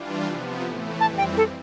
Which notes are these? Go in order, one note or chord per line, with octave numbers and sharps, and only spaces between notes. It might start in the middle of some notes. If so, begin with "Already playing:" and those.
Already playing: E3 G3 D4 F4
C3 F3 B3
A2 E3 A3
F2 E3 G3 C4 A5
G5
A4